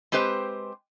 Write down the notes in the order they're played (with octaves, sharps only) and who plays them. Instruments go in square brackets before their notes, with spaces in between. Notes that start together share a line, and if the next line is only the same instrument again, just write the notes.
[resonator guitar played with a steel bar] G#3 C4 G4 B4 C5